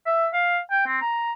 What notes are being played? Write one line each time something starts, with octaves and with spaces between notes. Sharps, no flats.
E5
F5
G5
C4
A#5